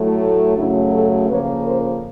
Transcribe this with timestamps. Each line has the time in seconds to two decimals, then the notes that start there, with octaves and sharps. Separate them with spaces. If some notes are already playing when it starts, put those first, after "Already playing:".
Already playing: A2 F#3 A3
0.57 F#2 C#3 F#3 A3 D4 E4
0.93 G4 A4
1.29 F2 C#3 F3 A#3 B4 C#5
1.65 A#4 C5